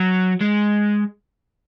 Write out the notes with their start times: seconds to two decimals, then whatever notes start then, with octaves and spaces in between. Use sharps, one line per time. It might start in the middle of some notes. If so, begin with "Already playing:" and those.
Already playing: F#3
0.41 G#3